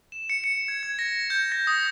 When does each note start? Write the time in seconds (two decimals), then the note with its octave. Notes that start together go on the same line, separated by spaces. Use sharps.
0.12 E7
0.30 C#7
0.44 C#7
0.68 G#6
0.83 G#6
0.99 A#6
1.30 G6
1.52 A#6
1.67 D#6